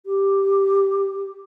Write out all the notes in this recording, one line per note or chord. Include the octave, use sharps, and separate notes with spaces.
G4